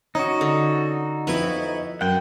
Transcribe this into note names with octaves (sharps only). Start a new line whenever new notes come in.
C#4 D#4 F#4
D3
F2 B3 E4 B4 C#5 B5
F#2 F#5 G5